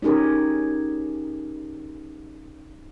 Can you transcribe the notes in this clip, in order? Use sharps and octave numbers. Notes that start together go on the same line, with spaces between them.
C#4 D#4 G4 G#4 A#4